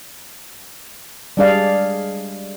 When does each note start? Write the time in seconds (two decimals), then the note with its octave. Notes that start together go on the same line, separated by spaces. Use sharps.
1.37 G3 G#3 D4 G#4 D5 F5